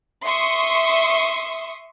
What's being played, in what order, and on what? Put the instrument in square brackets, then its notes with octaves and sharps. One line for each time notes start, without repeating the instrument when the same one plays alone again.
[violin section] E5 C6 C#6 D#6